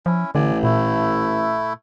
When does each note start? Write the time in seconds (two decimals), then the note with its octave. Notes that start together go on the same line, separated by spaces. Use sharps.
0.06 F3 C#4 E4
0.35 A1 D3 D5 G#5
0.63 A#2 A3 E4